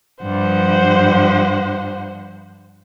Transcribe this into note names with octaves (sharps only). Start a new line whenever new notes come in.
G2 F3 C5 F#5